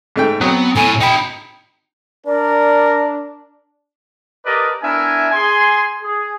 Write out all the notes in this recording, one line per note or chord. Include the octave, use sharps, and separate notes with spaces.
G#2 A3 G5
F#3 B3 C4
A2 G#5
D#4 G5 B5
D4 A#4 D5
G4 A#4 B4 D5 D#5 A5
B3 D4 E4 A#4 E5 G#5
G#4 G#5 C6
G#4